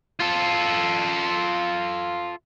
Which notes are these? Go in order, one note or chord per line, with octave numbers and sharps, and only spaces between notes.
F4 A4